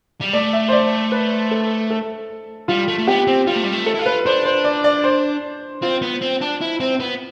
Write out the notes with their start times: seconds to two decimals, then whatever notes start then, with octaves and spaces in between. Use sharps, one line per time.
0.21 G3
0.33 A3 D5
0.53 E5
0.68 C5
0.72 D5
1.12 B4
1.51 A4
1.90 A4
2.68 G3 F4
2.88 A3
2.98 A3
3.07 B3 G4
3.27 C4
3.47 G3 F4
3.56 A3
3.64 G3
3.73 A3
3.86 A4
3.95 E4
3.99 F4
4.06 B4
4.26 D4 C5
4.45 C5
4.64 D5
4.84 D5
5.04 C5
5.82 C4 F4
6.02 B3
6.21 C4
6.41 D4
6.61 E4
6.80 C4
7.00 B3